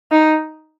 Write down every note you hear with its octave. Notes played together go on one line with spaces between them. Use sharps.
D#4